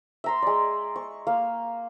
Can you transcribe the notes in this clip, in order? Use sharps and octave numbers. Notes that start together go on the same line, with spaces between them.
E5 A#5 C6
G#3 D5
C#6
A#3 F5